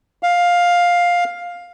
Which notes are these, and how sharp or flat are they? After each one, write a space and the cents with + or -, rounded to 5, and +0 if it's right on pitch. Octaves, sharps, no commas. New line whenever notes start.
F5 +10